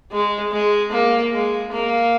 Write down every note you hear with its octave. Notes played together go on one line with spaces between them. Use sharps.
G#3
G#3
A#3
G#3
A#3